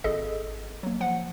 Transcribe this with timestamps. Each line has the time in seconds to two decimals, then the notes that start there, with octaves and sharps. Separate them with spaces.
0.04 G#1 G#4 A4 D#5
0.83 F#3 A#3
1.00 F3 F#5